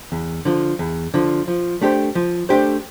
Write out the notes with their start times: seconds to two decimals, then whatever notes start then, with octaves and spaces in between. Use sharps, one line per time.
0.12 E2
0.45 D3 F3
0.79 E2
1.14 D3 F3
1.48 F3
1.81 A3 D4 G4 C5
2.15 F3
2.49 A3 D4 G4 C5